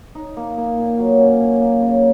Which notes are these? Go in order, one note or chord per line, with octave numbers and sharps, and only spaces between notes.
D#4
A#3
A#3
A#2
F#3
C#4
A#3
A#3
C#3